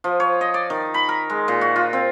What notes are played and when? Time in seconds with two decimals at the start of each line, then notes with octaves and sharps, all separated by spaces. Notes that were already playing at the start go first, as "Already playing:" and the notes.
0.04 F3
0.20 C#5
0.41 D#5
0.54 D5
0.70 D#3
0.94 B5
1.09 A#4
1.30 G#3
1.48 A#2
1.61 F#4
1.76 F4
1.93 C4